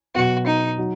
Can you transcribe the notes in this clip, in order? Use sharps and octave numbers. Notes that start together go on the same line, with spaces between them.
B2 F#3 B3 F#4
D#4
F#3 D#4 F#4